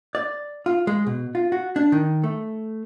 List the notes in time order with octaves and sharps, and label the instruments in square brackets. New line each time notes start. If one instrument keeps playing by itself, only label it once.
[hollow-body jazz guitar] D5
F4
G#3
B2
F4
F#4
D4
D#3
A3